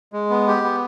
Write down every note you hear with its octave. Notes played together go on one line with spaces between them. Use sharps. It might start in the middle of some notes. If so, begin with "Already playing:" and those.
G#3
B3
G4
B3